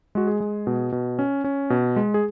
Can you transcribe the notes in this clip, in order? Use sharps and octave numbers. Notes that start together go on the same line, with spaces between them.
G#3 F#4
G#4
G#3
B2
B2
C#4
C#4
B2
G#3
G#4